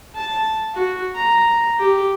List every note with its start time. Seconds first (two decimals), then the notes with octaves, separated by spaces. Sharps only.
0.16 A5
0.74 F#4
1.15 A#5
1.79 G4